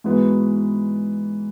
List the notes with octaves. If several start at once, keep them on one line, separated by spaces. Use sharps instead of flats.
G#2 E3 G#3 B3 F#4